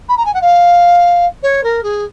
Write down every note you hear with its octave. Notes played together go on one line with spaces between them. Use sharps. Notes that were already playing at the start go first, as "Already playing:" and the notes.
B5
A#5
G#5
F#5
F5
C#5
A#4
G#4